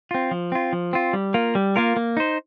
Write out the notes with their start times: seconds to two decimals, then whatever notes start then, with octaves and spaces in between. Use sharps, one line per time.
0.11 C4 F4
0.31 F3
0.52 C4 F4
0.73 F3
0.93 C4 F4
1.13 G3
1.34 A#3 F4 A#4
1.55 G3
1.76 A#3 F4 A#4
1.96 A#3
2.17 D#4 C5